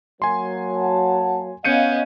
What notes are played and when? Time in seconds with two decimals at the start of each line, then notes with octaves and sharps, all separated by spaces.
0.22 F#3 A#3 G#5 C6
0.75 F#5 A5
1.65 B3 C#4 D#5 F5 G6 C#7 D#7